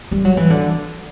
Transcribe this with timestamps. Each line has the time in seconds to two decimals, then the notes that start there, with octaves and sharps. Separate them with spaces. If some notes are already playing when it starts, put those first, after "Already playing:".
0.11 G3
0.25 F#3
0.37 E3
0.50 D3